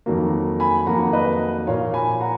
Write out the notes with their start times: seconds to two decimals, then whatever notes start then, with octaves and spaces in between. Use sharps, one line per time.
0.06 F2 D#3 F#3 A#3
0.60 G#5 B5
0.86 F2 D#3 F#3 A#3 F#5 A#5
1.13 B4 D#5
1.67 A#2 F3 A#3 C#5 F5
1.94 G#5 B5
2.21 F#5 A#5